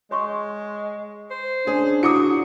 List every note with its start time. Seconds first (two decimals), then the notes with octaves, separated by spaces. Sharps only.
0.11 G#3 C#5 C6 C#6
1.31 C5
1.67 C#4 D4 G#4
2.03 E4 F#4 D6 D#6 C#7